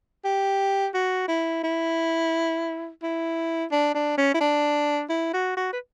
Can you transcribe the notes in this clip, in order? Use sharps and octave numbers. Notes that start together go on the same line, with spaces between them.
G4
F#4
E4
E4
E4
D4
D4
C#4
E4
D4
E4
F#4
F#4
B4